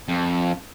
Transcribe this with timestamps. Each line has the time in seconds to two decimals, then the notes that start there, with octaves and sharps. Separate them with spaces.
0.08 F2